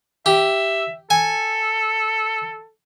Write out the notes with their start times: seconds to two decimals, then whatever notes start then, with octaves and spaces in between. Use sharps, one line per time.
0.26 G4 E5
1.10 A4 G#5